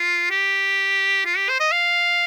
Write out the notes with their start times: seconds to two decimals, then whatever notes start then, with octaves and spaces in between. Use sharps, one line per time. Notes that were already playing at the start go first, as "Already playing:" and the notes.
Already playing: F4
0.30 G4
1.25 F4
1.37 G4
1.49 C5
1.60 D#5
1.72 F5